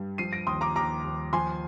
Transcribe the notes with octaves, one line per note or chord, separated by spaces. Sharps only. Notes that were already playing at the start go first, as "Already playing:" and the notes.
Already playing: G2
F3 C7 D#7
A#6 D7
D#2 C6 D#6
A#5 D6
D#2 A#5 D6
D#2
F3 G#5 C6